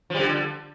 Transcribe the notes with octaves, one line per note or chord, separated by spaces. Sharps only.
D3 F3 G3